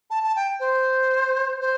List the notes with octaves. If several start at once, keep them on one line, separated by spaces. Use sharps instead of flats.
A5
A5
G5
C5
C5